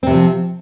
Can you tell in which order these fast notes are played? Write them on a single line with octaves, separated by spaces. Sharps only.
C4 C3 E3 F3